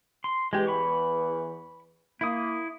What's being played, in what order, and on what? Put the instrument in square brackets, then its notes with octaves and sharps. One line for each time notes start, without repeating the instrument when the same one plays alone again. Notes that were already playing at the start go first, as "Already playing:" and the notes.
[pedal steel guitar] C6
[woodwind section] E2 E3 [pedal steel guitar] G#3 G4
[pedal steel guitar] B5 C#6
[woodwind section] A#3 [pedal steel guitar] E4 D#6